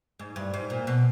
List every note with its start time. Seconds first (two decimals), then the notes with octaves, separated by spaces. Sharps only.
0.20 G#2
0.36 G2
0.54 G#2
0.70 A#2
0.87 B2